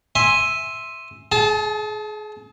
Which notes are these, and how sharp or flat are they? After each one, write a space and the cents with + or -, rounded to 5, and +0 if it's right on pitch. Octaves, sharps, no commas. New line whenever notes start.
E5 +0 G#5 +0 C6 +10
G#4 +30 A5 -20